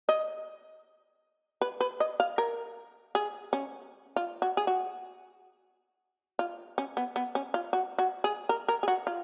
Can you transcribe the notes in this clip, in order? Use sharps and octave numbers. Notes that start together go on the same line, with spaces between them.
D#5
B4
B4
D#5
F5
A#4
G#4
C#4
F4
F#4
G#4
F#4
F4
C#4
B3
B3
C#4
F4
F#4
F#4
G#4
A#4
A#4
G#4
F#4
F4